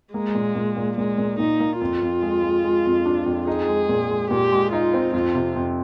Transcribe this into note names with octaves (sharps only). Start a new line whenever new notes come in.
G#3 A#3
A#2
A#2
A#2
A#2 G#3
A#2
A#2 D#4
A#3
F2 F4
F2
G#3
G#3
G#3
F2
D4
F2
D#4 G#4
G#3
A#2
G#3
A#2 G4
G#3
D#4 F4
C4
F2 F4
C3
F2